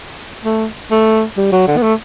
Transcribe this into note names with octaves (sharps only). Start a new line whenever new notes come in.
A3
A3
G3
F#3
D3
B3
A3